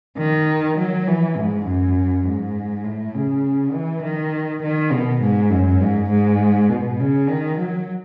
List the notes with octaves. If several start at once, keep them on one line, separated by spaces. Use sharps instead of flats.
D#3
F#3
E3
G#2
F#2
G#2
A2
C#3
E3
D#3
D#3
B2
G#2
F#2
G#2
G#2
B2
C#3
D#3
F#3